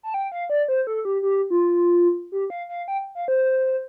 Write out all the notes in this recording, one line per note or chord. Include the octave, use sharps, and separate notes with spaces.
A5
G5
F5
D5
C5
A4
G4
G4
F4
G4
F5
F5
G5
F5
C5